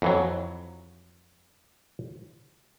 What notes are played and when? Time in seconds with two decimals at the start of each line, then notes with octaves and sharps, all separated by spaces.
0.02 F2 E3 F#3